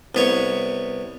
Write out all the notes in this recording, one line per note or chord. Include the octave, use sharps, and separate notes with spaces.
C2 B3 C#5